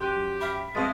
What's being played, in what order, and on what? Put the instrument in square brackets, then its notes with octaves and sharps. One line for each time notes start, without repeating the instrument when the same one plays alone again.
[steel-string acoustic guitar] F#2 [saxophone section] G4 [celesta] C6 F#6 D#7
[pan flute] E5 [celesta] B5 F6
[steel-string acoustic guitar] F2 C4 C5 [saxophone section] B2 G#3 [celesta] F5 D#6 A6